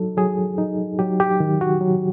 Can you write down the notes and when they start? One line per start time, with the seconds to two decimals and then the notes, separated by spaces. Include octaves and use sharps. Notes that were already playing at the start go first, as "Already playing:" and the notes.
Already playing: F#3 D#4 A4
0.17 F#3 G#4
0.58 D#4
0.99 F#3 G4
1.20 G4
1.40 D#3
1.61 F#4
1.81 F#3